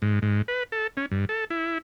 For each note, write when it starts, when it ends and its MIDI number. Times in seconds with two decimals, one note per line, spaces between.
0.02 0.19 44
0.22 0.42 44
0.48 0.63 71
0.72 0.87 69
0.97 1.06 61
1.11 1.25 43
1.29 1.45 69
1.50 1.78 64